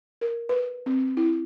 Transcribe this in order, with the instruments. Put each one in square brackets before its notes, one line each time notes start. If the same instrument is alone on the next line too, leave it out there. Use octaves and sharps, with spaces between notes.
[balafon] A#4
B4
C4
E4